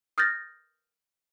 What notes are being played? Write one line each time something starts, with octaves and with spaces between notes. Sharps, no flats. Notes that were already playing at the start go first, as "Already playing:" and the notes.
D#6 F6 G6 A6 A#6